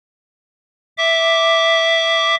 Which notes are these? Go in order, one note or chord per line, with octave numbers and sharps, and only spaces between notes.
E5 D6